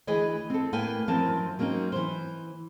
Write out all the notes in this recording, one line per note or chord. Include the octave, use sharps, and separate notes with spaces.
D2 E3 G#4 B4 D#5 G#5
C4 A4
A2 A#3 B4 G5 G#5
F#2 E3 F3 C4 A#4 A5
F#3 A#3 C4 C#4 D#4
E3 C5